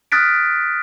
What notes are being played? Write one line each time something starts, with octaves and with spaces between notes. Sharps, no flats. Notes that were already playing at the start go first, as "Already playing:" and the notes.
D#6 F6 F#6 A6 B6 D7